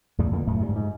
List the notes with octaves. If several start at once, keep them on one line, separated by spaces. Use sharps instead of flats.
E2 A2 C#3 G3
F2 A#2 D3 E3
F1 F#2 A2 A3
G#2 C3 D#3 G3
G#2